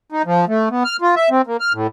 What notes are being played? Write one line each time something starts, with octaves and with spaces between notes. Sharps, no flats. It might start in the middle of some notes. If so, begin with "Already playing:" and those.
D#4
F3
A3
B3
F6
F4
E5
C4
A#3
F6
A2